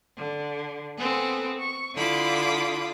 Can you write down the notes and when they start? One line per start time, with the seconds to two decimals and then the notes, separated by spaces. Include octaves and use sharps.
0.18 D3
0.97 B3 C4 G#4 A4
1.57 C#6
1.95 D3 E4 F4 B5 D6 D#6